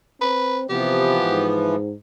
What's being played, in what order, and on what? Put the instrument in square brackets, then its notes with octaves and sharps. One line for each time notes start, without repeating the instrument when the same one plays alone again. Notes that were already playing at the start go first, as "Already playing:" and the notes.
[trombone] C4 [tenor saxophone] B4
[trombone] C3 [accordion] E3 F3 B3 [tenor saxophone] G4
[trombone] G#2